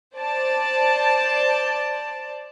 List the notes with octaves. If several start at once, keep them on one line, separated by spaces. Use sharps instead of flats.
C5 D5 A5